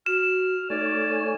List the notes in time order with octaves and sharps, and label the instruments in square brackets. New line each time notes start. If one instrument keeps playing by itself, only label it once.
[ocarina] F#4 [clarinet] F6 [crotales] E7
[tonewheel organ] A3 C#5 G#5 [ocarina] D#4 [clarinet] D5